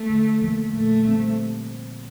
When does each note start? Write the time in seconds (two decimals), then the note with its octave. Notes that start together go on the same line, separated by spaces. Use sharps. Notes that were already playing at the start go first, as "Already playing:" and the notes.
Already playing: A3
0.10 D3
0.42 F3 A#3
0.73 A#2 A3
1.05 G3 C4